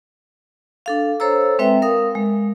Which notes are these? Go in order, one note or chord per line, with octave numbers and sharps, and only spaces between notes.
D4 A4 F5
A4 C5 C#5 A#5 E6
G#3 C4 B4 E5 G5
A#4 F5 D#6
G#3